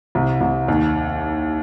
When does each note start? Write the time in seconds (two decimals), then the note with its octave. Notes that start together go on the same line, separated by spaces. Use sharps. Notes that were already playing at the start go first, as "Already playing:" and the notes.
0.15 C2
0.41 C2
0.68 D#2